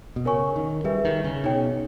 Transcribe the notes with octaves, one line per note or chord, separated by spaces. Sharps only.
B2
C#3 A#4 C#5 G#5 C#6
D#3
G3 G#4 B4 E5
D#3
C#3
B2 D#4 G#4 C#5 G5